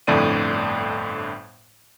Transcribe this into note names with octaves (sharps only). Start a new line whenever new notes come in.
G1 F2 A2 D3 D5 D#7